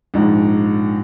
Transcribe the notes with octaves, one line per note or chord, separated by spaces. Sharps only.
A#1 G#2